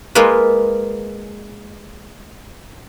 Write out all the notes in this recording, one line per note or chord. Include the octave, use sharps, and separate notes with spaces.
G#3 A#3 F4 B4